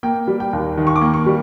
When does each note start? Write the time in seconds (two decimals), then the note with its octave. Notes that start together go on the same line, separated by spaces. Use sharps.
0.03 A#3 G5
0.28 G3
0.40 G5
0.53 D#2
0.78 D#3
0.87 C#6
0.96 D6
1.01 A#3
1.14 C#6
1.26 G3